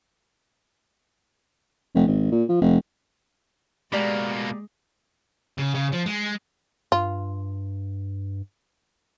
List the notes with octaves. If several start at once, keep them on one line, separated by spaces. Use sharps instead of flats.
F1
G#1
A#2
F3
F1
B2 G#3 A#3 G4 D5 A#5
C#3
C#3
F3
G#3
G2 F4